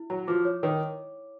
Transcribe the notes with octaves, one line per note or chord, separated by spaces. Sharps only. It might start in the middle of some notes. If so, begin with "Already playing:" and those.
Already playing: E4
F#3 A#5
F3 D6
C#5
D#3 C#5